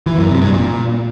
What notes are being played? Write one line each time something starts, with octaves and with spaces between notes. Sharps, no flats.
E3
F#2
C3
G2
A#2